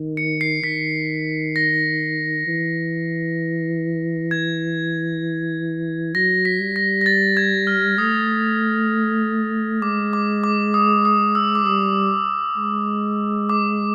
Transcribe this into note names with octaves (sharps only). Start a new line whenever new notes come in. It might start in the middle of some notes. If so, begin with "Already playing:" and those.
Already playing: D#3
C#7
C7
D#3 B6
A#6
E3
G#6
F#3 A#6
B6
G3
A#6
A#6
A6
G#6
F6
A3 D#6
G#3 D6
D6
D6
D#6
D#6
E6
D6
G3 D#6
G#3
D6